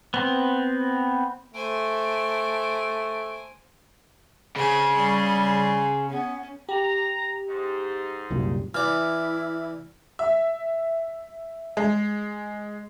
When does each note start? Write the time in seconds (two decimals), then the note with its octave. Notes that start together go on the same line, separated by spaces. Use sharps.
0.14 B3 C4
1.54 A3 C5 G#5 D7
4.56 C#3 G#4 C5
4.94 G3 G#4 C6
6.10 B3 C#4
6.69 G4 A#5
7.49 G#2 D#4 C6
8.30 C2 F#2 A#2
8.74 E3 E4 D5 F6
10.19 E5
11.77 G#3